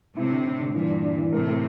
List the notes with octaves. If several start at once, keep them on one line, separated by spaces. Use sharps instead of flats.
A2 C3 E4
D3
D3
D3
G2 A#2 E3
D4
D4
E3
A2 C3 A#4
A3